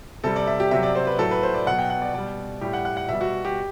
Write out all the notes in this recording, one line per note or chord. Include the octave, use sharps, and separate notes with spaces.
C3 G3 A4
D5
E5
G4
C3 F#3 E5
D5
C5
B4
A2 F#3 A4
B4
C5
D5
B2 F#3 F#5
G5
F#5
D5
B2 G3 D5
A2 G3 G4
F#5
F#5
F#5
B2 G3 E5
F#4
G4